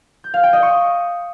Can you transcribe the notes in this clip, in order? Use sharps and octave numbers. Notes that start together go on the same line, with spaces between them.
G6
F5
G5
D#5
C#6